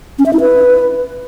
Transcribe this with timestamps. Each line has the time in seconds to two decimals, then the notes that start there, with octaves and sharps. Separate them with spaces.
0.19 C#4
0.26 E5
0.33 E4
0.40 B4